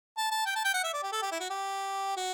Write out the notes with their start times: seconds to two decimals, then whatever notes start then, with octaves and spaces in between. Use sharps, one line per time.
0.17 A5
0.31 A5
0.46 G5
0.56 A5
0.65 G5
0.74 F#5
0.84 E5
0.93 D5
1.03 G4
1.12 A4
1.22 G4
1.32 E4
1.40 F#4
1.50 G4
2.17 F#4